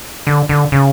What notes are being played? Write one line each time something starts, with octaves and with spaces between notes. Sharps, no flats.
D3
D3
C#3